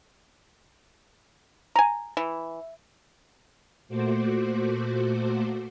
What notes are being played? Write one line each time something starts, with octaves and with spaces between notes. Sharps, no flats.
G#5 A#5
E3
A#2 A3 F#4 C5 D6